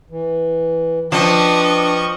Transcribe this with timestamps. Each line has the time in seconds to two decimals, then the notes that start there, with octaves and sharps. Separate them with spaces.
0.10 E3
1.12 F3 D4 B4 D#5 G5 C#6